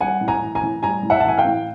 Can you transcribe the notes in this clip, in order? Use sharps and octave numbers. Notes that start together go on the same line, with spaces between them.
G3 F#5 G#5
A2
G#5 A#5
E3
G#5 A#5
A2
G3 G#5 A#5
A2
E5 F#5
A5
E3 G#5
F5 G5
A2